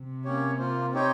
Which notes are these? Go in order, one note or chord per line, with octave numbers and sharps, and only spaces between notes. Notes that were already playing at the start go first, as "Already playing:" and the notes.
Already playing: C3
A#3 C#4 G4 C#5
A#3 F4 C5
C4 D#4 G4 C#5 G5